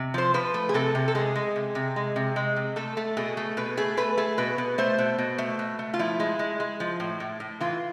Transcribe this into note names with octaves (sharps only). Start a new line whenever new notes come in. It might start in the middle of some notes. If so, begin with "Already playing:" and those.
Already playing: C3
F3 C5
F3 B4
A3
G#4
C3 A4
C3
A4
G#3 G#4
G#3
C3
C3
G#3
C3
G#3
C3
A3 A4
A3
B2 G#4
A3
B2 B4
A3 G#4
A3 B4
A3 G#4
B2 B4
B2
A3 C5
B2
B2
A3
B2
A3
F4
F3 E4
G#3
G#3
G#3
F3
A2
A2
A2
E3 F4